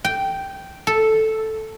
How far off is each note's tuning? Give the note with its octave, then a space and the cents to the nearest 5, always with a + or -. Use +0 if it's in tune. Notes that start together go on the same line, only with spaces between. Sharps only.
G5 -5
A4 +0